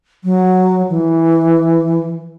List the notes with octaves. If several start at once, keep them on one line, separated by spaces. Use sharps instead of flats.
F#3
E3